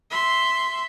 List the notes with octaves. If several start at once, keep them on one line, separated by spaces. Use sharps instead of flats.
E5 C6